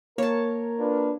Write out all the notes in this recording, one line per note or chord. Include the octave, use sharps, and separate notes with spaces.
A#3 A#4 C#5 A5
D4 F4 B4